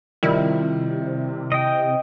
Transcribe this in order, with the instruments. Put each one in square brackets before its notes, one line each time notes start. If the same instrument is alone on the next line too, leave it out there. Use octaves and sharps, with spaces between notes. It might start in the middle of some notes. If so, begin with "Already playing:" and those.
[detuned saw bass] C3 [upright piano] D#3 F3 G3 [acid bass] E4
[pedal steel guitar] D#5 G5